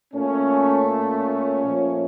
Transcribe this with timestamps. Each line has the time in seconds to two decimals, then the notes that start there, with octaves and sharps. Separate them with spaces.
0.13 A#2 A3 C#4
0.88 C#4
1.63 A#2 F3 A3